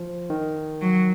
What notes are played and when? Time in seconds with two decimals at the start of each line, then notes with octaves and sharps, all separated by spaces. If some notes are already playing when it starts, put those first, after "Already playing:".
Already playing: F3
0.30 D#3
0.81 F#3